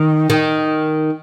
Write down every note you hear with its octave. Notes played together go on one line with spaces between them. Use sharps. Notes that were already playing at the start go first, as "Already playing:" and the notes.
Already playing: D#3
D#3